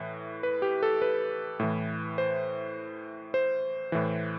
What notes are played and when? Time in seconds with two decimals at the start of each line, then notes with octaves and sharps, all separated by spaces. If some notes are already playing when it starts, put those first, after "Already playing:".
Already playing: A2 E3
0.43 B4
0.62 G4
0.83 A4
1.02 B4
1.60 A2 E3
2.18 C5
3.34 C5
3.92 A2 E3